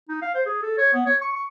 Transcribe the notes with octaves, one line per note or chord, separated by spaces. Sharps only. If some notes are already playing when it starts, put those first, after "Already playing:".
D#4
F5
C5
G#4
A4
C#5
B3
C#5
C#6
C#6